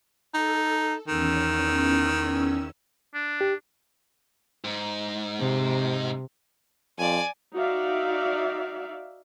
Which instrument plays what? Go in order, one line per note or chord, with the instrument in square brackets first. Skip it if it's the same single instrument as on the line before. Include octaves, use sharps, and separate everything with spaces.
[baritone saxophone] D#4 [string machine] A4
[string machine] E2 C#4 E6 [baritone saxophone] D#3
[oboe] D4
[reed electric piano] G4
[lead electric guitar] G#2
[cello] C3
[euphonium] F2 [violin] D5 G#5
[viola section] D#4 F#4 D5 E5 F5